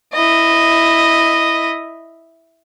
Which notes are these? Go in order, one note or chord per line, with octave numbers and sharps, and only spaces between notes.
E4 D#5